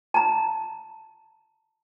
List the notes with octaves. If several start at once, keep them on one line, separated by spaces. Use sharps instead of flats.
A5 A#5